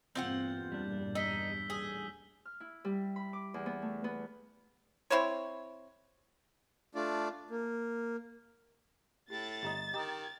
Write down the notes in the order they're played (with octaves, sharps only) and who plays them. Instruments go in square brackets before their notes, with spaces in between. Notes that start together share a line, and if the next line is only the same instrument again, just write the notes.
[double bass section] E2 G2 A#2 [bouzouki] C4 F4 F#5 [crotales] G6
[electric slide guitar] G3 D4
[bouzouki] D#4 [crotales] E6 B6 G7
[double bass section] A1 D#2 [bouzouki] G#4
[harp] F6
E4
G3
B5
D6
E2
B3
A3
B3
[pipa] C4 E4 C5 C#5
[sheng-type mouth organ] A3 D4 F4 D5
A#3
[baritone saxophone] A2 [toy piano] G4 [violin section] A6
[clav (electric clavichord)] G1 D#5 [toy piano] G4 A#5 C6
[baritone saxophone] D#3 [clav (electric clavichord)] G4 [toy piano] D#5 A#5 D#6